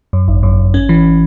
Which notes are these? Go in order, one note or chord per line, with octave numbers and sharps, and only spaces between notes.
F#2
G#1
F#2
G#1
C#4
E3